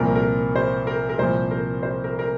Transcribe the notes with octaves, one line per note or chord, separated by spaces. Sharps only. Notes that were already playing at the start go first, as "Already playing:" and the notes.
Already playing: C2 A#2 F3 A#4
A#4
C5
A#4
A#4
C2 A#2 F3 C5
A#4
C5
A#4
A#4